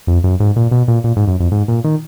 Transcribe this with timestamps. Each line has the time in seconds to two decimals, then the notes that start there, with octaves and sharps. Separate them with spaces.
0.07 F2
0.24 F#2
0.40 G#2
0.56 A#2
0.71 B2
0.88 A#2
1.04 A#2
1.17 G#2
1.27 F#2
1.40 F2
1.52 G#2
1.68 A#2
1.84 D#3